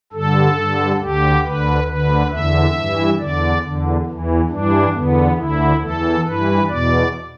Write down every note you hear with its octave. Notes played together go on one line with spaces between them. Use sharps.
G2 D3 A4
G2 D3
D2 D3 G4
D2 D3 B4
D2 D3 B4
E2 D3 E5
G2 E3
E2 D3 D5
E2 D3
E2 E3
G2 E3 D4
E2 D3 B3
D2 D3 E4
E2 E3 A4
G2 E3 B4
E2 B2 D5